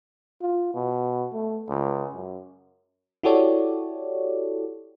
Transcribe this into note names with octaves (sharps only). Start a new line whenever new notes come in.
F4
B2
A3
C#2
F#2
E4 F#4 G4 A4 C#5 D5